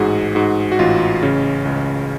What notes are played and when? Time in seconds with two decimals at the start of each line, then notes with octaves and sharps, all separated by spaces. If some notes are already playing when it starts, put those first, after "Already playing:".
Already playing: A1 G#2 F#4 G#4
0.35 G#2 F#4
0.72 F#4
0.79 A1 F4
1.23 C#3 C#4
1.65 C#2